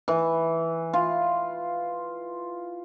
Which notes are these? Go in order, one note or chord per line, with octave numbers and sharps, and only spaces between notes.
E3
F4